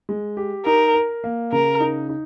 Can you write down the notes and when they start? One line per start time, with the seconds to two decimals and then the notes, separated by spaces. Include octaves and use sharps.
0.09 G#3
0.37 G4
0.65 D#4 A#4
0.94 A#4
1.24 A#3
1.52 C#3 A#4
1.80 D#4
2.09 D#4